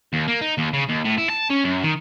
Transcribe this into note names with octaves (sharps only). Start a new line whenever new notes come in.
D#2
A#3
D#4
D#2
C#3
D#2
A2
E4
A5
C#4
F#2
D#3